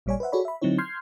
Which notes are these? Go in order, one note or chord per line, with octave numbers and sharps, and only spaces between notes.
A1 A#2 G3 C#5 D5 G#5
B4 C5 E5 F#5
F#4 G#4 A4 C#5 D5 B5
E5 B5
D3 F#3 C4 D#4 E4 C#5
C6 F6 G6 G#6 C7